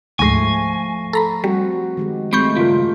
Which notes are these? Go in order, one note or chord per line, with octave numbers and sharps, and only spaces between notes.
D2 G#2 F3 A3 G#5 C#6 A#6 C7
A4 A#5 B5
G3 C4 F#4
D#3 G#3 G4
G#3 A3 C4 B5 C#6 G6
C#2 G2 F4 A#4